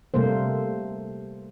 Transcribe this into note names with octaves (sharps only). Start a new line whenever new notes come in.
C3 G3 A3 A#3 C5